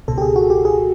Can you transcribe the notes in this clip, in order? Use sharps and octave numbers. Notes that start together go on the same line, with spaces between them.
C#2 B2 A4
G4
G#4
F#4
G4
G#4